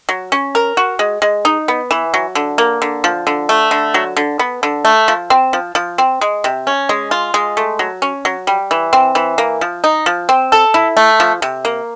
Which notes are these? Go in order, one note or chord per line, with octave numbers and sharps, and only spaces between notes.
F#3
C#4
A#4
F#4
G#3
G#3
D#4
B3
E3
F#3
D3
A#3
D3
F3
D3
A3
D3
F#3
D3
B3
D3
A3
F3
C4
F3
F3
C4
G#3
C3
C#4
G#3
F4
G#3
A3
F#3
C#4
F#3
G3
E3
C4
E3
A#3
F3
D#4
F3
C4
A4
E4
A3
F3
C3
A#3